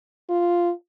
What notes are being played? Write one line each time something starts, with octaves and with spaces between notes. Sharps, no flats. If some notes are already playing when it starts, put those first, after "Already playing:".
F4